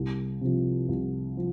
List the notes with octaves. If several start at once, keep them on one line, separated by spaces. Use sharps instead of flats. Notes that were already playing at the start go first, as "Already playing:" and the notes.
Already playing: C2
C3 F3
C2
F3